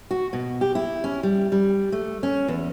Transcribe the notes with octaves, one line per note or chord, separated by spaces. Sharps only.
F#4
B2
G4
E4
C#4
G3
G3
A3
C#4
E2